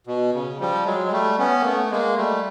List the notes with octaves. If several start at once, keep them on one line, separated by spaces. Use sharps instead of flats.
B2
C#3
F3 G3
F#3 G#3
G#3
G3 A3
B3 C#4
A#3
A3 B3
B3
G#3 A#3
G3 A3